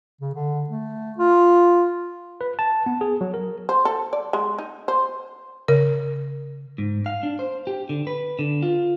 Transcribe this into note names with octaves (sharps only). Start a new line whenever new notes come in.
C#3
D3
A3
F4
B4
A5
B3
G#4
F#3
A#4
C5
A4
D5
G#3
D#4
C5
C#3 A#4
G#2
F5
D4
C5
G4
D3
B4
D3
F4